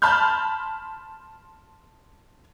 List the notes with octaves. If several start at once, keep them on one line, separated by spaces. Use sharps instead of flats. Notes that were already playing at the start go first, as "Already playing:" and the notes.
A5 B5 C6 F6 G6